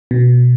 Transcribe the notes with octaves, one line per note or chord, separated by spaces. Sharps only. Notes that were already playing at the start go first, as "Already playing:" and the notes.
B2